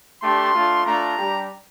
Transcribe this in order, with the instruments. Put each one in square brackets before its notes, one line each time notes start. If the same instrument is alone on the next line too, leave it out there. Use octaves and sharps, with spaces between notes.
[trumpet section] A3 D4 G4 C6
A3 D4 F4
A3 D4 F4 A#5
G3 D4 G4